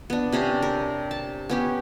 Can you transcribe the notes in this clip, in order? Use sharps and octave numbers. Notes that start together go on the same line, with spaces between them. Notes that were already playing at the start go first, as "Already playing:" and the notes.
B3 D4
C3 C#4 D4
A#4
A5
B3 C#4 G4